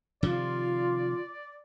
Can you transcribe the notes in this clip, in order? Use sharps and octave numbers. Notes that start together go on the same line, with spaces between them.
C3 D#3 F3 F4 D5